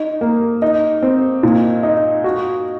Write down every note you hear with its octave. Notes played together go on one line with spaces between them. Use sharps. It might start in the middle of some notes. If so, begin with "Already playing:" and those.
Already playing: D#4
A#3
D#4
C4
A#2
D#4
F#4